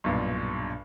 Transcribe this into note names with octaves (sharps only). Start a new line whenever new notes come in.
B1 G2 A#2